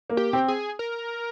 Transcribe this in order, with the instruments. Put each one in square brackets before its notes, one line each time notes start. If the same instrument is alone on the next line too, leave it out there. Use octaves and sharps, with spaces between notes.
[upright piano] A#3
[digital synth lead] G4
[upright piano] C4
[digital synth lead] G#4
A#4